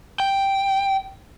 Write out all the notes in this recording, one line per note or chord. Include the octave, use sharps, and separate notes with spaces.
G5